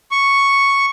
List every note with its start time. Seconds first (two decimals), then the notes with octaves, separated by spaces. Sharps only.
0.11 C#6